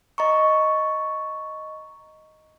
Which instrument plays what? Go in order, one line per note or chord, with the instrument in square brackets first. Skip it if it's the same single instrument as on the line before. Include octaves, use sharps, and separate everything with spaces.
[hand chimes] D#5 A#5 C#6